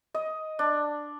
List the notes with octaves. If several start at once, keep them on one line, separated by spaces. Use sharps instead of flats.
D#5
D4